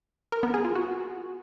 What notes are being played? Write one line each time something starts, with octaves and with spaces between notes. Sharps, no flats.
A#4
B3
G#4
F4
F#4